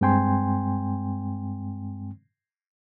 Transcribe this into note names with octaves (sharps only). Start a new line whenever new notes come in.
G2 G#3 C4 G5 G#5 C6